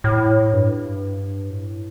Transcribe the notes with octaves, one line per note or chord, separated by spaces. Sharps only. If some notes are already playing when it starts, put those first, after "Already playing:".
A2
G2
A2